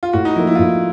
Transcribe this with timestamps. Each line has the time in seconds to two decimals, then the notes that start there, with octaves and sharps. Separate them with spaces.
0.03 F4
0.13 A2 F#4
0.25 D#4
0.36 F3 A#3 E4
0.47 E4
0.55 F4
0.59 A2 E4